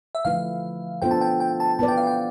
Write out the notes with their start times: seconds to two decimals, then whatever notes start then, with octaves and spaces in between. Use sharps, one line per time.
0.15 E5
0.25 D3 F3 A3 E4 B4 F5
1.02 B3 D4 F4 A4 C5 G5
1.11 A5
1.21 G5
1.40 G5
1.60 A5
1.79 B3 E4 B4 D5 A5
1.88 G5
1.98 F5
2.07 G5